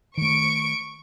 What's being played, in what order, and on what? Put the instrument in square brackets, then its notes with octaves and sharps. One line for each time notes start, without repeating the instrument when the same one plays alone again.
[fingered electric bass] D#3 A3 [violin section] C#6 D7